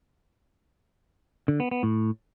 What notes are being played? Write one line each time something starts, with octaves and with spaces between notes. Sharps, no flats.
D3
B3
B3
A2